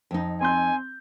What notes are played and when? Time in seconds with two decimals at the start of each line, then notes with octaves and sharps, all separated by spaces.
0.11 F2 D#4
0.41 C4 G#5 C6 G6